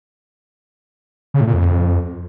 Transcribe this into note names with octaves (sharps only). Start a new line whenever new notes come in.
C#3
A2
A#2
F2